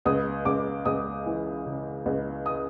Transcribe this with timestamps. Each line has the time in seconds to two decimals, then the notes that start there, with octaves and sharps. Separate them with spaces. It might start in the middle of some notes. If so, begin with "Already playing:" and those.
0.05 C#2 D#6
0.45 C#2 D6
0.85 C#2 D#6
1.26 E3
1.66 C#3
2.06 C#2
2.46 D#6